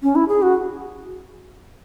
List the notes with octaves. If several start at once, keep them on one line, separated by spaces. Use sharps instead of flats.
C#4
E4
G#4
F#4